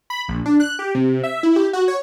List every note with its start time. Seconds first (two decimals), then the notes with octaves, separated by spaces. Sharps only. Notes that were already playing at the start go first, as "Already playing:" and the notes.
0.10 B5
0.28 A#1
0.46 D4
0.60 F#6
0.79 G4
0.95 C3
1.23 E5
1.43 E4
1.56 G4
1.73 F#4
1.88 C#5